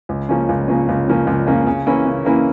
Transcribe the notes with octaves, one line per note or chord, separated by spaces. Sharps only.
C#2
C#3 F3 A#3 C#4
C#2
C#3 F3 A#3 C#4
C#2
C#3 F3 A#3 C#4
C#2
C#3 F3 A#3 C#4
C#3
E3 A#3 C#4 E4
C#3
E3 A#3 C#4 E4